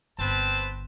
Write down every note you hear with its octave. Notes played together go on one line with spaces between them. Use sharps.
G1 C4 B4 A5